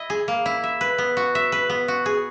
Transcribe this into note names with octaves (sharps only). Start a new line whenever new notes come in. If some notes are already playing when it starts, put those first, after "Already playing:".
Already playing: E4 D#5
G#4
A#3
E4
E5
B4
B3
F#4
E5
B4
B3
F#4
G#4